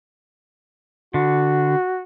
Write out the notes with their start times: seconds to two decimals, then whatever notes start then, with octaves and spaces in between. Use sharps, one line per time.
1.14 D3 F#4